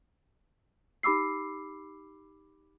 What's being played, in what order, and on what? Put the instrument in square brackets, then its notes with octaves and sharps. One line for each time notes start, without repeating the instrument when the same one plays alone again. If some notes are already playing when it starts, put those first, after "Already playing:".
[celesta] D#4 G4 B5 D6 E6 C7